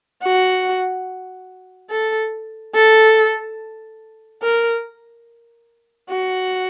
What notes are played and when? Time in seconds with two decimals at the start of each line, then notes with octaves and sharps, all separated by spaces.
0.23 F#4
1.91 A4
2.75 A4
4.42 A#4
6.10 F#4